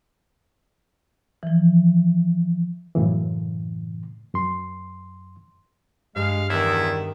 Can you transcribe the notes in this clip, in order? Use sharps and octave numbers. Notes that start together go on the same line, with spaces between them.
E3 F3
F#2 A2 C#3 E3
F#2 C6
G2 G#3 F5
E2 D#3 E4